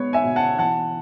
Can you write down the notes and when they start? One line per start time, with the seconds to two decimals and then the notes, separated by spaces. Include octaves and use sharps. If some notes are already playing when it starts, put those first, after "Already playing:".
Already playing: G#3 B3 C#5
0.13 E5 G#5
0.24 B2
0.36 F#5 A5
0.58 E3 F#5 A5